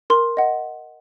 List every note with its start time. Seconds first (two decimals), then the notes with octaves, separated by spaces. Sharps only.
0.10 A#4 C6
0.37 D#5 F#5